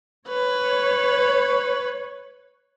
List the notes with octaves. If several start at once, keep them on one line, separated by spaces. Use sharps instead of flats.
B4 C#5